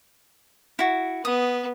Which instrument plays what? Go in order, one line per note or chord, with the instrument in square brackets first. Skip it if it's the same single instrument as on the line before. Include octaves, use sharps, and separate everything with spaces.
[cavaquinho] E4 F#4
[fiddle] B3 [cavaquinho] D#6